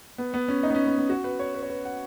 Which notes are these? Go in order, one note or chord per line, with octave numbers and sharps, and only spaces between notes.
B3
B3
C#4
D#4
B3
C#4
B3
B3
F#4
B4
C#5
B4
C#5
B4
F#5